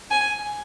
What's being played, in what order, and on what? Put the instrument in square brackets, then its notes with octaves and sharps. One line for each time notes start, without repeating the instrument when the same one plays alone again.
[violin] G#5